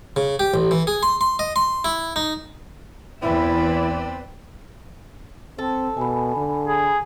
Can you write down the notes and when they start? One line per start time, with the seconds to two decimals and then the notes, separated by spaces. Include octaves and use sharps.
0.16 C#3
0.39 G4
0.54 A1
0.71 E3
0.87 G#4
1.03 C6
1.21 C6
1.39 D#5
1.56 C6
1.85 E4
2.16 D#4
3.22 E2 E3 C4 E4 B4 D5 E5
5.58 C4 A4
5.97 B2 G#5 B5
6.36 D3
6.67 G#4